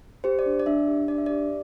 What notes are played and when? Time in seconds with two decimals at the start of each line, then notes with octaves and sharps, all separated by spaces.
0.24 G4 C5
0.39 D5
0.46 D4
0.60 D5
0.66 D4 E5
0.88 G4
1.08 D4 D5
1.18 E5
1.26 G4 D5